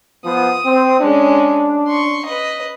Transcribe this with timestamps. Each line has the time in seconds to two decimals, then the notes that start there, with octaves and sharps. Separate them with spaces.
0.25 F3 B3 D#6
0.65 C4
1.00 G#3 C#4 D4
1.88 C6 C#6
2.25 B4 D#5